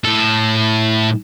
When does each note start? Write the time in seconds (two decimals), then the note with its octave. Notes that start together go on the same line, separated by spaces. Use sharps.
0.05 A2 A4